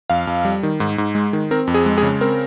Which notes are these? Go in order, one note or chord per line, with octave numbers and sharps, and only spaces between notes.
F2 F5
F2
G3
D#3
G#2
G#2
G#3
D#3
C4 A#4
F2
G#4
G#3
G#4
C#3
C4 A#4